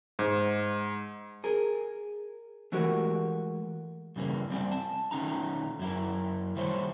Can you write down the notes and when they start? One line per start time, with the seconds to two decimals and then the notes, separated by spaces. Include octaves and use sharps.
0.19 G#2
1.44 G#4 A#4
2.72 E3 G#3 A3 F#4 G4 A#4
4.16 G2 C#3 E3 A#3
4.50 G3 C4 D5 G#5
4.71 A5
5.11 D#3 F3 A3 C#4 D#4 A#5
5.79 F#2 E4 A#4
6.56 D#3 G3 A3 C5 C#5